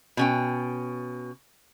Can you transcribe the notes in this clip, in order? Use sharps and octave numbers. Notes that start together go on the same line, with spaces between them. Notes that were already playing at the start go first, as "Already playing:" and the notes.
B2 C#4 G5